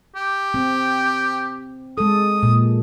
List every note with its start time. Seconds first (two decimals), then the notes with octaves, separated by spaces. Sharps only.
0.16 G4
0.54 C4
1.98 G#3 A4 D#6
2.43 A#2